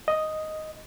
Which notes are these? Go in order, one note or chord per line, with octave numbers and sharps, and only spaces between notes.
D#5